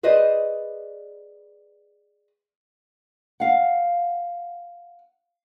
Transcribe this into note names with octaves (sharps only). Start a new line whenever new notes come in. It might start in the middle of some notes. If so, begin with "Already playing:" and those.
G#4 B4 C5 D5 D#5
F5 F#5